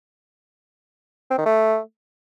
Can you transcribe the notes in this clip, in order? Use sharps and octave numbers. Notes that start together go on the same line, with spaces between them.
C4
D#3
A3